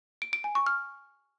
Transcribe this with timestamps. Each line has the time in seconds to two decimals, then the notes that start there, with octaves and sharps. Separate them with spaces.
0.22 D7
0.33 D7
0.44 G#5
0.55 C#6
0.66 F6